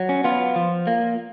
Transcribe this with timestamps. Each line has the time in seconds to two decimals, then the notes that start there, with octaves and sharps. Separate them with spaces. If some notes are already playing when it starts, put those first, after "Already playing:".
Already playing: F#3
0.09 C#4
0.24 B3 F4
0.56 F3
0.87 A#3